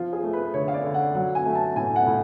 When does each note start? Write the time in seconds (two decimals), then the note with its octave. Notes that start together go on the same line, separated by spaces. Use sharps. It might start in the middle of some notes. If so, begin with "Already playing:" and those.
Already playing: F3 F4
0.13 G#4
0.23 A3
0.33 B4
0.54 D3 C#5
0.68 F5
0.74 D5
0.84 D3
0.94 F#5
1.15 F#3 F#5
1.35 G#5
1.45 A3
1.55 A5
1.76 A2 G#5
1.96 F#5
2.07 A2